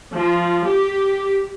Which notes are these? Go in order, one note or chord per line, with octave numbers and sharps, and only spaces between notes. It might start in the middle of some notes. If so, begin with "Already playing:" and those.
F3
G4